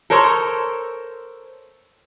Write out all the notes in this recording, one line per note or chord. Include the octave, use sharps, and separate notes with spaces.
A4 A#4 C5 C#5